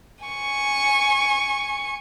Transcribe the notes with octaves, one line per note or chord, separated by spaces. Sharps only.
G#5 C#6